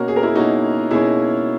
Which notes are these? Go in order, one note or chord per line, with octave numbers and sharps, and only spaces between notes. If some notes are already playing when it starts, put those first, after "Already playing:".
Already playing: B2 A#3 C#4 F#4 A#4
G#4
A#4
E4 G#4
B2 A#3 C#4 D#4 F#4
B2 A#3 C#4 E4 G#4